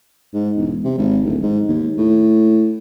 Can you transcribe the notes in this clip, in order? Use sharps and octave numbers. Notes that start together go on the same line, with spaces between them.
G#2
E1
C3
G#1
D1
G#2
D#2
A2